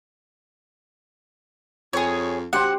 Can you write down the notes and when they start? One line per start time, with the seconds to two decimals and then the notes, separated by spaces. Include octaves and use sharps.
1.93 F2 G#4 C#5
2.53 G4 C5 F#5 G5